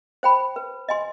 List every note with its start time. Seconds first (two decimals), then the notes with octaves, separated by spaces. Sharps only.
0.23 C5 G5 B5
0.56 B4
0.89 D#5 G#5 C6